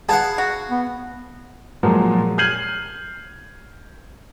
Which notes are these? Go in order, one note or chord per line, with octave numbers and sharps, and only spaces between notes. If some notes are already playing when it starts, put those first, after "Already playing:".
B3 G#4 F5 F#5 A5
F#4
B3
A#2 F3 F#3 G#3
F6 G6 G#6 C7 D#7 F#7